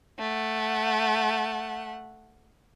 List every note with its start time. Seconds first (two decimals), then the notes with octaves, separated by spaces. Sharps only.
0.19 A3 F#5